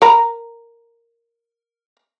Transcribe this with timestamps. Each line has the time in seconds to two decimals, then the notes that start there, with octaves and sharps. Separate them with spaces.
0.02 A#4 A#5 B5